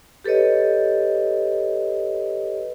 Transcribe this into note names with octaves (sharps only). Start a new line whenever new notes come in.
G4 A4 B4 C#5 D#5